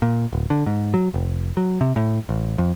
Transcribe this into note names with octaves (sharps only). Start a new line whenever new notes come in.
A#2
D1
D3
G#2
F#3
F1
F#3
C3
A2
A1
F2